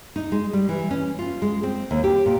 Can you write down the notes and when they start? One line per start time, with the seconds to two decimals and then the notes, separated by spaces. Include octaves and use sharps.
0.16 D#4
0.32 G#3
0.53 G3
0.69 E3
0.91 C#4
1.19 F4
1.42 G#3
1.63 C4
1.91 D#2
2.04 G4
2.26 A#2